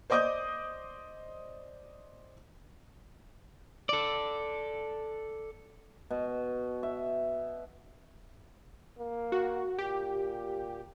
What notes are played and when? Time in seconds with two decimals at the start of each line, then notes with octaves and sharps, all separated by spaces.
0.10 C5 D5 D#5 D6 D#6 G6
3.89 A4 D5
6.11 B2
6.83 E5
8.98 A#3
9.32 F#4
9.79 A#2 G4